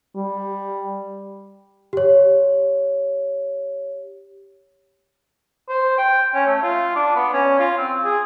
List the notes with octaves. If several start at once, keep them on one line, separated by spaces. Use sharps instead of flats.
G3
G4 C#5
C5
G5
C#4
A3
F4
D4
B3
C#4
F4
C4
G#4